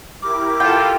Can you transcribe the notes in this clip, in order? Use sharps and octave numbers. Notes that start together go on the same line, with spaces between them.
E4 G4 A#4 D6
F4 A4 G5